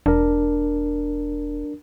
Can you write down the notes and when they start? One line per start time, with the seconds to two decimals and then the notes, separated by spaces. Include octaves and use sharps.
0.06 E1 D4 A#4